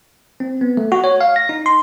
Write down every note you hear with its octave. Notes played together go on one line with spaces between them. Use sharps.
C4
B3
A3
F#4
C#5
F5
A#6
D#4
C6